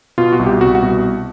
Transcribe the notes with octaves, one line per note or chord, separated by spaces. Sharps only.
B2 F4
F#4
C2
G4
C2 F#4
F#4
B2